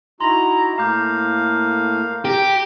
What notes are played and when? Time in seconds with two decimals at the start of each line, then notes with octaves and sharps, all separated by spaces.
0.20 D#4 E4 F#4 A#5 C6 A#6
0.78 A2 A3 A#3 F5 A#5 D6 G6
2.25 G4 A#5 A#6